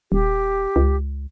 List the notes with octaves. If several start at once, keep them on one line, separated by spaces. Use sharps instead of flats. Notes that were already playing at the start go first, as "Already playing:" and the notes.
D#1 G4
C#2